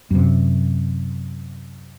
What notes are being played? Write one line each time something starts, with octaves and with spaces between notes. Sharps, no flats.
F#2 C3